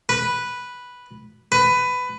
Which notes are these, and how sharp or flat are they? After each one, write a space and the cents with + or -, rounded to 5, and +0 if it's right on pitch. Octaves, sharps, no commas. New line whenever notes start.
B4 -5
B4 +15